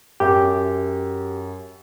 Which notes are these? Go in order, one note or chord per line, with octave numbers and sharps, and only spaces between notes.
F#2 G4 E5